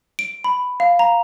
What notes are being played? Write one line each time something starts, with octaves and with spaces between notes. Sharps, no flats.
D7
B5
F5
A#5